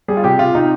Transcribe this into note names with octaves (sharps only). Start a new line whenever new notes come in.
G3 G#4
F4
C3 G4
C3 F4
C3 D#4